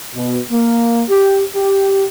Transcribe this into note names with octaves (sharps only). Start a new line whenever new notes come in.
B2
A#3
G4
G4